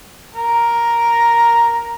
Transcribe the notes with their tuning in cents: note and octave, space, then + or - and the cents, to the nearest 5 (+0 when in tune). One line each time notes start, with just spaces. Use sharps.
A#4 +5